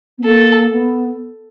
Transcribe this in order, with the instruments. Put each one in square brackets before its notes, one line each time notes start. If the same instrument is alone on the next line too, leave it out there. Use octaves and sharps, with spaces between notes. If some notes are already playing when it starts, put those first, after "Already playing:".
[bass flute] B3
[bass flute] A#3 [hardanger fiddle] A4
[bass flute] B3